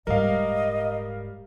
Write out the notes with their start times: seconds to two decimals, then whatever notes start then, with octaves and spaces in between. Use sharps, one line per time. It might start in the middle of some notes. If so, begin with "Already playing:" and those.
0.07 D#1 G#2 G3 A#4 D#5 F5